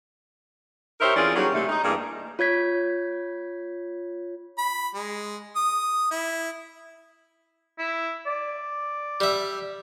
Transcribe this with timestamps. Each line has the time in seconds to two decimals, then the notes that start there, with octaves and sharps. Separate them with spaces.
1.00 D#4 G4 A#4 C5 C#5 E5
1.16 E3 C4 C#4 F4 G#4 D5
1.36 F#3 G3 A#3 C#4 D#4 G#4
1.54 C3 A3
1.69 D#4
1.84 G2 E3 G3 A#3 G#4 A#4
2.39 F4 C#5 G#6 B6
4.58 B5
4.95 G#3
5.56 D#6
6.11 E4
7.79 E4
8.27 D5
9.20 G3 E5